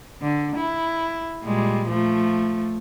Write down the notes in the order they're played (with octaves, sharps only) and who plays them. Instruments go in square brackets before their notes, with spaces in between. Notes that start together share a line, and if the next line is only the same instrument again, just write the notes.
[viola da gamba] D3
E4
A#2 G3 G#3
F3 A3